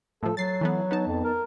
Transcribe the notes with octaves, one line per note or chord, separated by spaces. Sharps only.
A2 F3 A4
F#3 A6 C7
E3 A3 B3
B3 D#4 A5
F2
A#4